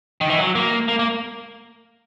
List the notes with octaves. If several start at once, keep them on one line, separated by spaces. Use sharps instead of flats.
D#3
E3
F#3
A#3
A#3
A#3